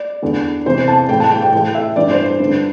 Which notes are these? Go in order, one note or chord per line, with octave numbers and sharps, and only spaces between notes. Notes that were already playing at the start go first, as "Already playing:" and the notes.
Already playing: D5
E2 D3
E2 C3 E3 C5
A5
A2 E3 G5
A5
G5
G5
A2 E3 G5
E5
G2 E3 D5
C5
C5
G2 D3